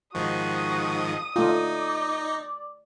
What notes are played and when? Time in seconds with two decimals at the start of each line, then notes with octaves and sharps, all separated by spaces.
0.15 G#2 D#3 F3 F#4 D#6
1.36 A3 D#4 F4 D5